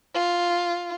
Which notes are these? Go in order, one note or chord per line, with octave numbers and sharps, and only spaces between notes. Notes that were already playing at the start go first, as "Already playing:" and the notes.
F4